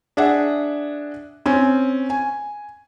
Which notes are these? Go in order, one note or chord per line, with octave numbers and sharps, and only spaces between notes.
D4 G#4 E5 F#5
C4 C#4
G#5